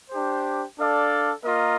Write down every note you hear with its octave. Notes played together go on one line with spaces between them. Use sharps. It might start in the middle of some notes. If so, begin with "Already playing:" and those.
D4 G4 C5
D4 A4 D5 F5
A#3 F4 A#4 D#5